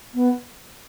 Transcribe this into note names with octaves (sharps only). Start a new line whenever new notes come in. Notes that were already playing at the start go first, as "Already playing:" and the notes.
B3